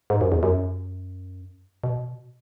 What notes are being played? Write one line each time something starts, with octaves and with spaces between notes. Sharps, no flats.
G#2
F#2
E2
F#2
B2